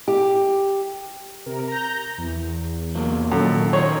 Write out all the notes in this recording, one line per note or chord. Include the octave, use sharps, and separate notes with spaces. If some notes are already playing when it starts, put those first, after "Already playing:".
G4
C3 A#4
A#5 G6
E2
C2 F#3 A#3
F#2 A#2 D#3 A4
C#4 D#4 C5 C#5